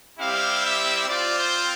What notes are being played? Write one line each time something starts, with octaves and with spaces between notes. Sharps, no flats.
G3 C4 E4 G4 F5
E5
C4 F4 D5
C5